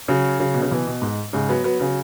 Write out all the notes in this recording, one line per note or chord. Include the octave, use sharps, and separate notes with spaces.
C#3 F#3
C#3 F#3
B2
C#3
B2 E3
B2
G#2
G#2 C#3
F#3 B3
F#3 B3
C#3 F#3